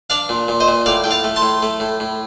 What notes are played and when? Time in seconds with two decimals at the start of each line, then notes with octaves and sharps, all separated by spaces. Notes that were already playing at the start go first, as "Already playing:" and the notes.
0.10 D4 D5 F5
0.29 A#2
0.48 A#2
0.60 C5 D#5
0.68 A#2
0.86 A2 D5 F5
1.04 A2 G5
1.11 F5 A5
1.24 A3
1.36 A5 C6
1.42 A2
1.62 A3
1.80 A2
2.00 A2